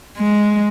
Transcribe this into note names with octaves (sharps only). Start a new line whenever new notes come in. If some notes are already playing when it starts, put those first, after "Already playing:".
G#3